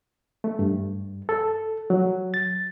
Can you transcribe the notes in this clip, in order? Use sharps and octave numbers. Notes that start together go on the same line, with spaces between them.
A3
G2
A4
F#3
A6